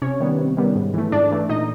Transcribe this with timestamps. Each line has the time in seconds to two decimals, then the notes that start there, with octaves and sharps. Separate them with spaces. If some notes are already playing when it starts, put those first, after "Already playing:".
0.02 C3 C#4 C#5
0.20 D#3 G3 B3
0.39 C3
0.57 D#3 G3 B3
0.76 G#2
0.94 E3 A3
1.12 G#2 D4 D5
1.31 E3 A3
1.49 A#2 D#4 D#5